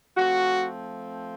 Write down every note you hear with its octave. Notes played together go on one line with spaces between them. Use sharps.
F3 A3 C4 F#4